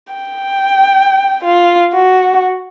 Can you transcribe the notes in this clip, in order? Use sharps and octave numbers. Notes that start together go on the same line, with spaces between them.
G5
F4
F#4